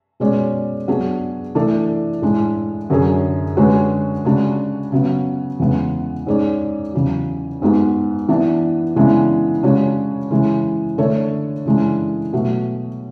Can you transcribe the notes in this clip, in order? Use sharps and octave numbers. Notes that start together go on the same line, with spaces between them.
B2 G#3 C#4 G#4 D5
F#3 B3 D4 G#4
E3 A3 D4 A4 D5
A2 G#3 D4
F#2 D3 F#3 C#4 G#4
D3 G#3 C#4 F#4 B4
C#3 G#3 D4 F#4
C#3 F#3 B3
E2 C#3 G#3 B3
G#2 G#3 C#4 G#4 D5
E2 C#3 F#3
G#2 G#3 B3 F#4
E3 B3 D4
C#3 E3 G#3 B3 D4
C#3 G#3 D4 F#4 C#5
C#3 E3 G#3
D3 A3 D4 A4 C#5
C#3 E3 G#3 D4
B2 F#3 A3